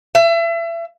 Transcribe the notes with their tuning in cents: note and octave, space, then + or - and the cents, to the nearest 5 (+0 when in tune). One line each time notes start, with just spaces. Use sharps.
E5 +30